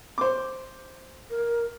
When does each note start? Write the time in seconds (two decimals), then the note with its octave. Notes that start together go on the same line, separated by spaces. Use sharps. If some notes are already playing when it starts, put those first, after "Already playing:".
0.18 C5 D6
1.30 A#4